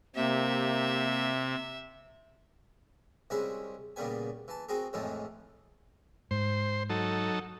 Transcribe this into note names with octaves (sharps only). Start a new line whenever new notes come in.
C3 A#3 G4 E5
C2 G#3 C#4 E4 C5 G#5
A#2 C#3 G3 B3 G#5
E3 A5
C4 F#4 G#4 A#4
F2 A2 E3 F3 G#3
G#2 C5
F#3 D#4 A4